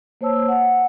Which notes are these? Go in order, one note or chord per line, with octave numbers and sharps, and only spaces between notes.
A#3 C5 C#5 A5 E6
F#5